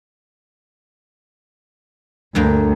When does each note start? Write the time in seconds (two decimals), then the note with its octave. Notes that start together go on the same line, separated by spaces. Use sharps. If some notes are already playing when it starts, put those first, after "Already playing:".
2.35 D2 G2 G3 A#3